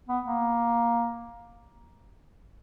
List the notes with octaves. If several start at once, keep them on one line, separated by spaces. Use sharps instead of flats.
B3
A#3